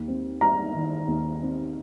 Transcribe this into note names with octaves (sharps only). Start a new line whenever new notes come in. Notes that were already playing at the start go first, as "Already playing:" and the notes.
Already playing: D#2
C4
G3 A#5
D#3
D#2
C4